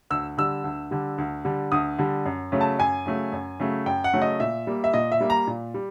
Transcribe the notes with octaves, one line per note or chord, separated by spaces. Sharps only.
D2 E6
D3 G3 E6
D2
D3 G3
D2
D3 G3
D2 D#6
D3 G3
F#2
C#3 F#3 A3
A5
F#2 G#5
C#3 F#3 A3
F#2
C#3 F#3 A3
F#2 G5
F#5
C#3 F#3 A3
D#5
A#2 E5
G3 A#3
E5
A#2 D#5
E5
G3 A#3
A#5
A#2
G3